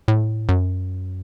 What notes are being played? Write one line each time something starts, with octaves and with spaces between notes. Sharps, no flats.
A2
F#2